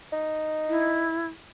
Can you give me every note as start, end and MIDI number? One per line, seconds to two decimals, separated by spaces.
0.12 1.11 63
0.69 1.27 64